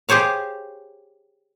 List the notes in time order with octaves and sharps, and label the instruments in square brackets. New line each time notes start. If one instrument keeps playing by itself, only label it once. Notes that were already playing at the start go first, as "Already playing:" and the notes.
[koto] G4 G#4 C5 C#5 F5